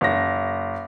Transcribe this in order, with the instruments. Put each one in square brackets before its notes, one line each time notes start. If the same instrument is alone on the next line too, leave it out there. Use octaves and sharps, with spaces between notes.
[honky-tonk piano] F#1 A#6